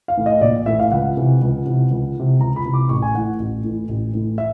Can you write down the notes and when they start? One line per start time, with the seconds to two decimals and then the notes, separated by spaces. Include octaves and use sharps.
0.08 F5
0.17 A2 E3
0.26 D#5
0.41 A#1 D5
0.66 A2 E3 E5
0.80 F5
0.92 C#2 F#5
1.17 C3 E3
1.42 C#2
1.66 C3 E3
1.91 C#2
2.16 C3 E3
2.40 C#2 A#5
2.56 B5
2.65 C3 E3
2.74 D6
2.89 A1 C#6
3.02 G#5
3.14 A2 E3 F#5
3.39 A1
3.64 A2 E3
3.89 A1
4.13 A2 E3
4.38 E5